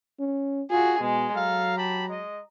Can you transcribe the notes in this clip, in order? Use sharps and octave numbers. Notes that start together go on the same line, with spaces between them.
C#4
F4 F#4 G#4
B2 G#3
F#3 A4 F5 A#5
G4 A5 B5
G#3 D#5